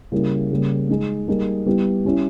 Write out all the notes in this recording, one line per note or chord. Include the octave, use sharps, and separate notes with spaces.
C#3 G3 A#3 E4
C#3 G3 A#3
G#3 D#4 G#4
G3 A#3 D#4 G#4
G3 B3 E4 G4
G3 C#4 E4